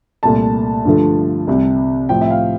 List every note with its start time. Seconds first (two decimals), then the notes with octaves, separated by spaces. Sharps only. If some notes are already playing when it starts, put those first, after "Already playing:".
0.23 C2 A#2 A3 A5
0.85 G2 D3 F3 A3
1.47 C2 C3 G3
2.09 A2 F3 C4 G5
2.21 E5
2.31 F5